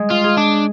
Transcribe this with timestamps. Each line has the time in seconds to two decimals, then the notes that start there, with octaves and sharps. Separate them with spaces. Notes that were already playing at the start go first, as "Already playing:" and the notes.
Already playing: G#3
0.10 F4
0.24 G#4
0.37 D4